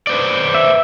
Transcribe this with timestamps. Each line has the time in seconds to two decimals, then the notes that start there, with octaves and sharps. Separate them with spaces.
0.07 B4 C5 D5
0.55 E5